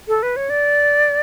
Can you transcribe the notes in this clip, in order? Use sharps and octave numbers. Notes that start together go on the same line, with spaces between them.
A4
B4
C#5
D5